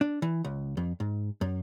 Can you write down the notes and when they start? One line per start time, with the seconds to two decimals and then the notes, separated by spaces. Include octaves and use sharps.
0.01 D4
0.22 E3
0.44 C#2
0.77 F2
1.00 G#2
1.41 F#2